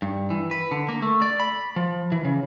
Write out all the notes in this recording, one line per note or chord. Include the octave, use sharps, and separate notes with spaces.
G2
E3
B4
D3
A#3
A3
D5
B5
F3
E3
C#3